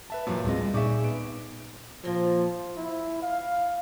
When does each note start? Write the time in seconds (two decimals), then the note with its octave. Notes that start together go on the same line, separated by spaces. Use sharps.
0.10 B4 E5 A5
0.27 F2 A#2 E3 F#3
0.45 D1 G#3 C4 D#5
0.63 G3
0.74 A#2 D#4 G#4 D5 E5 C#6 D6
1.04 B3 D7
2.04 A#2 F3 A#3 C4
2.77 E4
3.22 F5